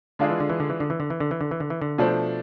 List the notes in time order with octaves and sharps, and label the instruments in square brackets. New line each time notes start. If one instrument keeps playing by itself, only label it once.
[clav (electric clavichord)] D3 [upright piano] G#3 D4 F4 G#4
[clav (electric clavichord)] E3
D3
E3
D3
E3
D3
E3
D3
E3
D3
E3
D3
E3
D3
E3
D3
[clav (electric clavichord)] B2 [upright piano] F3 A3 D4 A4 C5